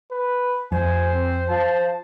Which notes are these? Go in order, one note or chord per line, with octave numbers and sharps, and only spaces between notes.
B4
F2 C5 G#5
C4
F3 A5